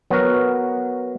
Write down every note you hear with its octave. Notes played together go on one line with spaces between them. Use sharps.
F#3 B3 F#4 A#4